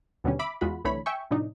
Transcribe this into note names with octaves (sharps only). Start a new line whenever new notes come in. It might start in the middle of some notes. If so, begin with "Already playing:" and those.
D#2 B2 D3 G3 C#4
E5 B5 D6
E2 G#3 F4 F#4 B5
C2 D3 E3 A3 C#5 B5
E5 G5 G#5 C#6
A2 C3 F3 D4 D#4